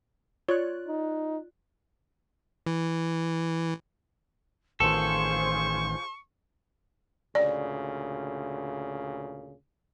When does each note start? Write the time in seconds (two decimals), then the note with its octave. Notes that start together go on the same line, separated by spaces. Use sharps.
0.48 F4 C#5 D5 F#6
0.88 D#4
2.67 E3
4.80 A1 D#3 F4 G#4 A4 C5 C#6
7.35 D2 A#2 C#3 D5